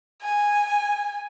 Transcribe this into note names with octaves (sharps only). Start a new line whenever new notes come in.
G#5